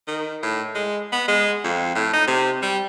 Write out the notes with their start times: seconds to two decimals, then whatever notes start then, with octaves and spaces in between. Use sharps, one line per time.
0.08 D#3
0.43 A2
0.75 G#3
1.12 B3
1.28 G#3
1.64 F2
1.95 A2
2.13 D#4
2.27 C3
2.62 G3